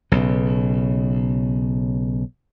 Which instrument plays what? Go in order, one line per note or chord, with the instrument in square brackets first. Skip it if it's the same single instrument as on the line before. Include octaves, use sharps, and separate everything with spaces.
[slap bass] B1 C#3